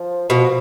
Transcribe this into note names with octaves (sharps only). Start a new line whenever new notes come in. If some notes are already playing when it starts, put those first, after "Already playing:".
Already playing: F3
B2 F3